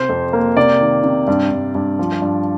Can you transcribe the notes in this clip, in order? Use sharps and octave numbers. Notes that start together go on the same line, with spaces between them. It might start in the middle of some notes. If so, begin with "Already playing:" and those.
Already playing: C3 C5
F2
A#3
C3 D5
D#3
C3
G2
G2
G2
F3
G2